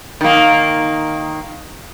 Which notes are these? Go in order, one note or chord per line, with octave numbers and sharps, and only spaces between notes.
D#3 A#3